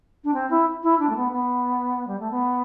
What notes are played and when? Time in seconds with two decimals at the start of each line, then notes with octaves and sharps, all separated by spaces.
0.24 D4
0.34 C4
0.50 E4
0.83 E4
0.99 D4
1.09 A3
1.16 B3
1.32 B3
2.07 G3
2.19 A3
2.31 B3